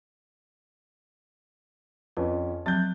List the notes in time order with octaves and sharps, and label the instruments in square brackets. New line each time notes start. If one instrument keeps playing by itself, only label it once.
[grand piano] F2 C#4 [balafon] B4
[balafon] F3 F#3 C4 [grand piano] F#6 G6 A6